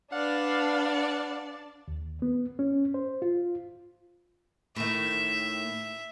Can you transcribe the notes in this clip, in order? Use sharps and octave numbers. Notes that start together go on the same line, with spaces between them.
D4 B4 D5 F5 F#5
D#2
B3
C#4
C5
F4
A2 D#3 E5